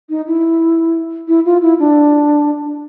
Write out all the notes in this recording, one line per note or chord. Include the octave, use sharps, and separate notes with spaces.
D#4
E4
E4
F4
E4
D4